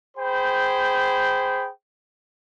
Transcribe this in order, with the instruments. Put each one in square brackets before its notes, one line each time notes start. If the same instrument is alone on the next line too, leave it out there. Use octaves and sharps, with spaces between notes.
[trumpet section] G#4 C5 G5 B5